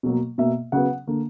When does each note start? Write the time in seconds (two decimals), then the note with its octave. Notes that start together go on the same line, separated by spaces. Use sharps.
0.03 B2 F#3 A#3
0.38 B2 A#3 E5
0.72 C#3 F#3 B3 F#5
1.07 D3 A#3